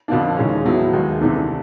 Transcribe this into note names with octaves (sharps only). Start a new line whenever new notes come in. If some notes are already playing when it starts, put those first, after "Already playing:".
F2 D3 F3 A#3 D4
D#2 C#3 E3 G#3 C#4
A2 F#3 B3 E4
D#2 D#3 G#3
C2 C3 E3 A3 D4